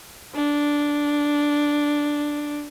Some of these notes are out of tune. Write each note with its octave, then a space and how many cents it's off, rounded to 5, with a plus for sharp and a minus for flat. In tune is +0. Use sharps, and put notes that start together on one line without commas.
D4 -5